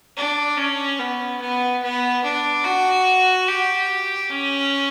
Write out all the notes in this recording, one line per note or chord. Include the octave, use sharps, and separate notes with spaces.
D4
C#4
B3
B3
B3
D4
F#4
G4
C#4